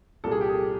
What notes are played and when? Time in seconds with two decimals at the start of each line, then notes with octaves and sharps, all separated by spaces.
0.24 C2 A#2 G3 A4
0.31 G#4
0.41 G4
0.49 G#4